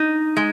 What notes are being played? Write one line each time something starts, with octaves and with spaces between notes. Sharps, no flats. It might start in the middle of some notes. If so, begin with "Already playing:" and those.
Already playing: D#4
G#3